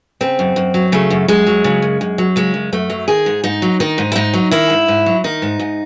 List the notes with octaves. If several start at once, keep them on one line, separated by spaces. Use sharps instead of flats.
C#3 C4
F#2
F#2
F#3
C#3 A3
F#2
F#2 G#3
F#3
C#3
F#2
F#2
F#3
C#3 G#3
F#2
F#2 A3
F#3
D#3 G#4
G#2
G#2 D#4
F#3
D#3 D#4
G#2
E4
G#2 D#4
F#3
D#3 E4
G#2
G#2
F#3
D#3 D#4
G#2
G#2